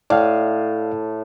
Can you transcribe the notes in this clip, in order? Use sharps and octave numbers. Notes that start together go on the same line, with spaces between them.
A2 D5 F5